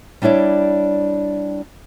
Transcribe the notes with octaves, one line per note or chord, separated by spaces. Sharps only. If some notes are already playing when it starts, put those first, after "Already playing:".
G3 D4 E4 C#5 D5